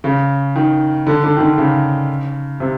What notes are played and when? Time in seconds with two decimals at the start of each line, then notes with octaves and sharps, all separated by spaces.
0.04 C#3
0.56 D#3
1.07 D3
1.24 D3
1.37 D#3
1.41 D3
1.58 C#3
2.60 C3